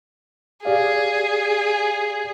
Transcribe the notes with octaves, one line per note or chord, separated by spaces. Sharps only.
G4 G#4 D5 F5